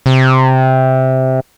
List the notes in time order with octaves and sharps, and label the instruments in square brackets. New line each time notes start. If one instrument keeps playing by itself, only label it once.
[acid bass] C3